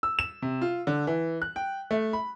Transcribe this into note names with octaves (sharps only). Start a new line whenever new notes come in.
E6
E7
C3
F4
D3
E3
F#6
G5
A3
B5